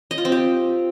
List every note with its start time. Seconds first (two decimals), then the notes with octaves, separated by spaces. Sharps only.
0.11 D#5
0.18 F4
0.25 C4
0.32 G4